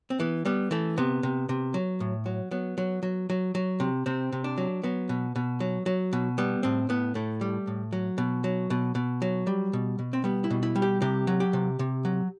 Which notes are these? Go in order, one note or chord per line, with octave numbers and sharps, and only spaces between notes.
C4
E3 B3
G3 B3
E3 A3
C3 B3
C3
C3
F#3
A2
F#3
F#3 B3
F#3
F#3
F#3
F#3
C3
C3 C4
C3
D4
F#3
F#3 B3
B2
B2
F#3
F#3
B2
G3 B3
A2 C4
A2 B3
A2 A3
G3
A2
F#3
B2
F#3
B2
B2
F#3
G3
B2
B2
C4
G3 B3
E4
B2
E4
G3
G4
C3 G4
F#3
G4
C3
C3
F#3